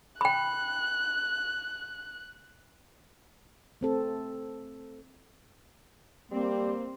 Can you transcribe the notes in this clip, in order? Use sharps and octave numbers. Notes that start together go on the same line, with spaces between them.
G5 B5 F#6
A3 C4 A4
G3 A#3 C4